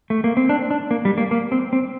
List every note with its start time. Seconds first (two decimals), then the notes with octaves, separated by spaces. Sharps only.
0.10 A3
0.24 A#3
0.37 C4
0.49 D4
0.71 D4
0.91 A#3
1.05 G3
1.18 A#3
1.31 A#3
1.52 C4
1.73 C4